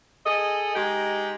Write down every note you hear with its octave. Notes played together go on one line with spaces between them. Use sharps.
G#4 A4 D#5
G#3 D#4 G4